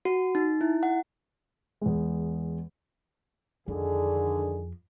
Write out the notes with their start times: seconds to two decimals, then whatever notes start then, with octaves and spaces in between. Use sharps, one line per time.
0.05 F#4
0.35 D#4
0.61 E4
0.83 F#5
1.81 E2 G#3
3.68 F2 D3 D#3 G#4